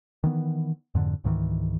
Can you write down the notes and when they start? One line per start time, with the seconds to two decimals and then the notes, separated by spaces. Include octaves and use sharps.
0.24 D#3 E3 B3
0.95 F2 G#2 D3
1.24 C#2 G#2 D#3 E3